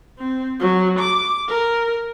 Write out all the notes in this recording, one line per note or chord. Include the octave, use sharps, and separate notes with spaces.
C4
F#3
D6
A#4